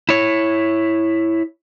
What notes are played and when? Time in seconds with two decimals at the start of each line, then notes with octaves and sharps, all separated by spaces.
0.09 E4 C#5